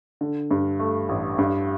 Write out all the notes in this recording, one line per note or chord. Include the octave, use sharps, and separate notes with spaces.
D3
G2
A3
A1
G2